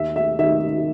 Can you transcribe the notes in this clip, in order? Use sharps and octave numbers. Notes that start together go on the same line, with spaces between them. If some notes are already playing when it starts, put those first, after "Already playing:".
Already playing: D#2 E5
E5
D#3 E5